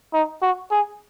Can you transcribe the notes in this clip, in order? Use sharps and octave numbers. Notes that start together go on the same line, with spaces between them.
D#4
F#4
G#4